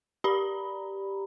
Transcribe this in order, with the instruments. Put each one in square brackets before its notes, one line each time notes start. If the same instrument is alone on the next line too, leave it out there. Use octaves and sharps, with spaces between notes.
[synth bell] G4 D5 A#5 B5